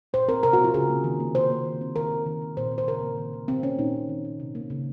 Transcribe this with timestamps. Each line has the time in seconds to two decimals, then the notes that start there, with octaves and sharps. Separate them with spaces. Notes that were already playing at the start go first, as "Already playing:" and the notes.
0.13 A#2 C5
0.28 C4 A#4
0.43 C3 A#4
0.53 F#4
0.58 C4
0.64 F4
0.74 C#3 G#4
0.90 A#3
1.04 D#3
1.20 A#3
1.35 C3 C5
1.50 A#3
1.65 D#3
1.81 C4
1.96 D#3 A#4
2.12 A#3
2.26 D#3
2.42 C4
2.57 A#2 C5
2.72 C4
2.78 C5
2.87 C#3 A#4
3.02 A#3
3.17 D#3
3.33 D#3
3.48 C3 C4
3.63 A#3 C#4
3.79 A#2 D#4
3.94 C4
4.09 D#3
4.25 C4
4.40 C3
4.55 A#3
4.70 C#3